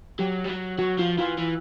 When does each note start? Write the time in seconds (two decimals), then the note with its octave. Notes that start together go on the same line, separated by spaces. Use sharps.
0.19 F#3 G4
0.45 G3
0.49 F#3
0.79 F#3 F#4
0.98 F3 F4
1.18 E3 F4
1.38 E3